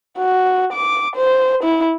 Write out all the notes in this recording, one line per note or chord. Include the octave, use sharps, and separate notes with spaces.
F#4
D6
C5
E4